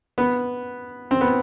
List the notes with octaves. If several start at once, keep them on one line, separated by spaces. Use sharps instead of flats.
B3
C4
B3